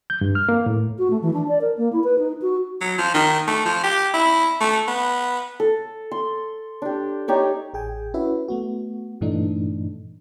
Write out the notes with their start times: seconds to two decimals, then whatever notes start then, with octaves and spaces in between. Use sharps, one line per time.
0.10 G6
0.21 G2
0.35 F6
0.49 A#3
0.66 A2
0.98 F#4
1.10 A3
1.22 E3
1.33 D4
1.48 D5
1.61 A#4
1.78 A#3
1.93 E4
2.04 B4
2.18 D#4
2.42 F#4
2.81 F#3
2.98 F3
3.14 D#3
3.48 A3
3.65 F3
3.83 G4
4.14 E4
4.61 A3
4.88 B3
5.60 A4
6.11 C6
6.82 D4 G4
7.28 D#4 G4 C#5 D5
7.73 A1 G#4 G5 G#5
8.14 C#4 E4 F#4 B4 E5
8.48 A3 B3 F#4
9.21 G2 A#2 E3 A3 D4 D#4